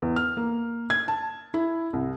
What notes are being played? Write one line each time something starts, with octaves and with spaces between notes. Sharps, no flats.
E2
F6
A#3
G#6
A5
E4
C2